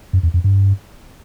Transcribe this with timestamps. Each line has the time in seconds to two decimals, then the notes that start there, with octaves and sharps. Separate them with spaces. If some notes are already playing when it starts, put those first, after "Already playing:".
0.13 F#2
0.23 E2
0.34 F2
0.44 G2